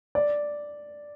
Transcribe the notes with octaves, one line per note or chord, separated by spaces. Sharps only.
D5